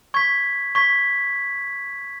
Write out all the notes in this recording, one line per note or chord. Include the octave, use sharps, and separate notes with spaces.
C#6 G#6 B6
C#6 G#6 B6